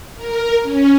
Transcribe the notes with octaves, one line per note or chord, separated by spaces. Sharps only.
A#4
C#4